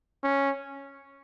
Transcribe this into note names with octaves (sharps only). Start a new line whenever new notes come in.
C#4